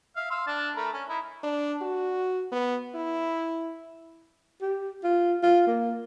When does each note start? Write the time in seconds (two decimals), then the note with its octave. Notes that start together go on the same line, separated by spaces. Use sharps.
0.16 E5 F5
0.30 F5 C6 E6
0.47 D4 A5
0.76 A3 A#4 B5
0.93 C#4
1.09 D#4 E4
1.43 D4
1.82 F#4
2.52 B3
2.95 E4
4.62 G4
5.04 F4
5.43 F4
5.67 A#3